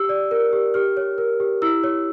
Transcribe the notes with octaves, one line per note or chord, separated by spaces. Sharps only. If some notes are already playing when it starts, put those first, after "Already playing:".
Already playing: G4 E6
D5
A#4
G4
G4 F6
C#5
A#4
G4
E4 E6
C#5